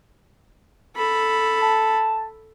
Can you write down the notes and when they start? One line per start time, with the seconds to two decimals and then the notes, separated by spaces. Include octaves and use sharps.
0.96 A4 B5
1.62 A5